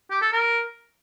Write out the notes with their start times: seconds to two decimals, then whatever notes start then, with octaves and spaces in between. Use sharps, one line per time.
0.11 G4
0.21 A4
0.32 A#4